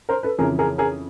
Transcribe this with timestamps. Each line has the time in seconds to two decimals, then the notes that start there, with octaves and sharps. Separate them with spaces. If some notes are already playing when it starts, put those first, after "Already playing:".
0.09 A#4 C5
0.23 A4 B4
0.38 F2 C#3 E3 G#4 A#4
0.59 G#4 A#4
0.78 G#4 A#4